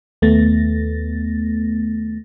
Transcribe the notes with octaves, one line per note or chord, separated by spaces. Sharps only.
D#2 A3 B3 A6 A#6